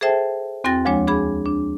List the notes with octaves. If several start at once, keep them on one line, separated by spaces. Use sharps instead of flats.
G#4 A4 C5 E5 G5 A5
E2 C4 F#4 G5 A6 A#6
D2 F3 G#3 D4 C#5 G#5
D4 G#4 B5
D4